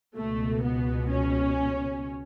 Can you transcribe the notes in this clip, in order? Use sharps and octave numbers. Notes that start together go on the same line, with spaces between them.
C#2 B2 A3
B3
C#4